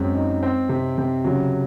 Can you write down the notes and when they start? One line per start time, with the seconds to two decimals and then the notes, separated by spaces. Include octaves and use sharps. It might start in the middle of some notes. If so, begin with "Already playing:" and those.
Already playing: F#2 G#3 C4
0.14 D#4
0.43 C4
0.69 C3
0.98 C3
1.24 C#3 F#3